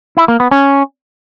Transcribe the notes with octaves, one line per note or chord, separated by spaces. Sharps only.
E4
A#3
B3
C#4